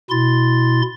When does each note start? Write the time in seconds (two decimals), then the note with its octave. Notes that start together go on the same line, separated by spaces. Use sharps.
0.10 B2 E4 C6 A6